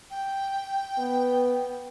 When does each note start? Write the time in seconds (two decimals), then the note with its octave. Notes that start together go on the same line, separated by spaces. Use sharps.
0.11 G5
0.98 B3